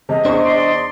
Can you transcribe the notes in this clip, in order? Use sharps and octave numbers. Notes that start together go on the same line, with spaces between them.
C3 G#3 D#5
E2 D4 G#4 C5 C#6
D5 C6